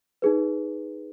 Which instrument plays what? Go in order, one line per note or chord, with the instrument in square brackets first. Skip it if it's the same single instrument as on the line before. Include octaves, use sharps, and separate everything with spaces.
[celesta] D#4 G#4 B4